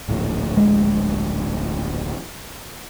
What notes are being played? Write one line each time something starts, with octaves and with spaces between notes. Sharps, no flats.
D1 A#1 A2
G#3